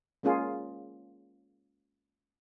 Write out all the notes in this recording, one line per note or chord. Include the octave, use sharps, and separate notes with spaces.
G#3 A#3 C#4 F4 G#4